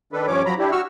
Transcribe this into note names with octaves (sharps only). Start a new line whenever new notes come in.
D#3 D4 A4 B4
G2 F3 C#4 C#5 D6
F3 F#3 A#5 B5
D4 E4 G4
F#4 C#6 E6 F6